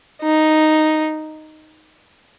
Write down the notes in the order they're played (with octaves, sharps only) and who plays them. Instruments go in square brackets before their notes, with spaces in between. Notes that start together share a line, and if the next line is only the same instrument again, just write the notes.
[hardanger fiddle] D#4